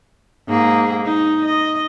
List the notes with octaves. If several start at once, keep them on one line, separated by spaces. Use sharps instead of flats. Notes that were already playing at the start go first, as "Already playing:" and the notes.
G#2 A#3 G#4
D#4
D#5